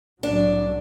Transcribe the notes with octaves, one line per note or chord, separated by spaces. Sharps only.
C2 A2 F#3 D4